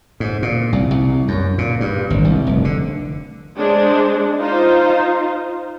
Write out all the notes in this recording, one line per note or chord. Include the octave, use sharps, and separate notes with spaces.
G#2
A#2
C2
C2
F#2
A#2
G2
G#1
C2
F1
D3
G#3 D4 C5
D#4 F4 C5